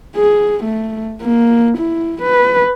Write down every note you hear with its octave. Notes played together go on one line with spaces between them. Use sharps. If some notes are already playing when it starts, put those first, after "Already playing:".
G#4
A3
A#3
E4
B4